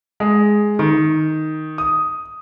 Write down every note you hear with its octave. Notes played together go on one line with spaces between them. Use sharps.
G#3
D#3
D#6